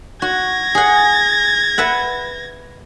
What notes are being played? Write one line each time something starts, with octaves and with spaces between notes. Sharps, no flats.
F#4 G#6 A#6
G#4 F#5
B4 E5 F#5